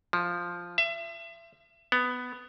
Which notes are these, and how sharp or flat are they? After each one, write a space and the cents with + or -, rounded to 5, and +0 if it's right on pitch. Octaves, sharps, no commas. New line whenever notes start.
F3 +0
E5 +30
B3 +10